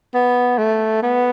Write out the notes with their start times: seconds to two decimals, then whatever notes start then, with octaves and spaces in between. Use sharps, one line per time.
0.14 B3
0.58 A3
1.03 B3